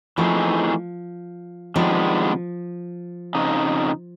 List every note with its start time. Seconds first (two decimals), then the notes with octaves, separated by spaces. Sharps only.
0.18 E3 F3 A3 C4 D#4 G#4
1.76 C3 D#3 F3 G#3 B3 D4
3.35 F2 C#3 D#4